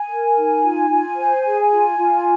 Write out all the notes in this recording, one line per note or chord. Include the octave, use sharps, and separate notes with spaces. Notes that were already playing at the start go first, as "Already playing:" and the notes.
Already playing: G#5
A#4
D#4
F4
F4
C5
G#4
F4
F4